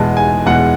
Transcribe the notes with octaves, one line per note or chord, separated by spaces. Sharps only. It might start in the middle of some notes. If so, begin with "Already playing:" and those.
Already playing: E2 B2 G#3 A5
G#5
E2 B2 G#3 F#5